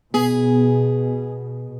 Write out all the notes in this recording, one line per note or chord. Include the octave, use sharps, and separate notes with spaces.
B2 B3 G#4